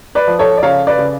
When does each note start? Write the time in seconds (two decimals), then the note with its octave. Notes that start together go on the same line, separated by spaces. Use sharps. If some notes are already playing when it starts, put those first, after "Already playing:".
0.15 B4 D5
0.27 F3
0.39 A4 C#5
0.57 D5
0.63 C#3 C#5 F5
0.87 B4 D5
0.98 C#3